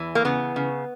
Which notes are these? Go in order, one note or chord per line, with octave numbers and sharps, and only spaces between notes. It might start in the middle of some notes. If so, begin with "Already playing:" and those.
Already playing: E2 E3
A#3
C#3 B3
C#3